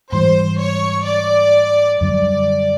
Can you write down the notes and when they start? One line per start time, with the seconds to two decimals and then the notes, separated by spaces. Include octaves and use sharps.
0.12 G#2 E3 G3 C5
0.59 C#5
1.06 D5
2.01 F#2 D3 G3 D5